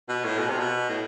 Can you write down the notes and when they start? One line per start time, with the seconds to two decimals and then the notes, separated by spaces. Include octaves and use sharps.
0.09 B2
0.24 A2
0.39 B2
0.49 C3
0.59 B2
0.89 A2